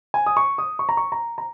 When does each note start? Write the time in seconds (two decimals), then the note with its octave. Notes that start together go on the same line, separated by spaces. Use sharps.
0.14 G#5
0.26 D#6
0.37 C#6
0.58 D#6
0.79 C#6
0.89 A#5
0.97 C#6
1.12 A#5
1.38 A#5